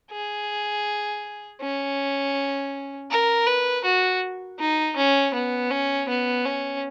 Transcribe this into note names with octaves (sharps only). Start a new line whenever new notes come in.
G#4
C#4
A#4
B4
F#4
D#4
C#4
B3
C#4
B3
C#4